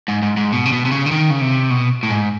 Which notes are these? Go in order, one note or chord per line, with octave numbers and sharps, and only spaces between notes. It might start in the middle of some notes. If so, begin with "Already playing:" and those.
G#2
G#2
G#2
B2
C3
B2
C3
C#3
D3
D#3
C#3
C3
B2
A2
G#2